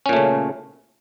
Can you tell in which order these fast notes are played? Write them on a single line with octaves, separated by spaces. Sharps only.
C#4 A#2 A3 C#3